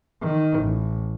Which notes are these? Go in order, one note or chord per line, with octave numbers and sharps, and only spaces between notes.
D#3
A1